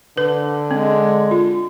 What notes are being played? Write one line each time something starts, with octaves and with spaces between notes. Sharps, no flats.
D3 B4
G#3 C4
F4